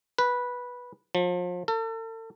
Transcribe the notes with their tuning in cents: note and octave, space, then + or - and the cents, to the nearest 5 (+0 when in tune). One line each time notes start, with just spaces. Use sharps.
B4 -10
F3 +35
A4 +40